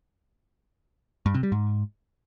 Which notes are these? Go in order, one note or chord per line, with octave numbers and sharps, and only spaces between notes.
G2
C3
G3
G#2